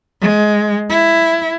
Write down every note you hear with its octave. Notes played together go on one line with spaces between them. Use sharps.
G#3
E4